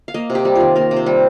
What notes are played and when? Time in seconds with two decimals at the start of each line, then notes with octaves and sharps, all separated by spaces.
0.08 F5
0.14 A#3 D#5
0.30 C3
0.35 G4
0.45 G3
0.56 D#3 F4
0.76 A#3 A#4
0.91 C3
0.97 C5
1.06 G3